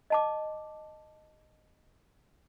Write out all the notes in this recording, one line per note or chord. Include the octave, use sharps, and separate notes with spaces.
D#5 A5 D6